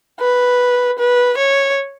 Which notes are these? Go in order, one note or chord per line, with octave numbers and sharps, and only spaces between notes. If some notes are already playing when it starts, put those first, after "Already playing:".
B4
B4
C#5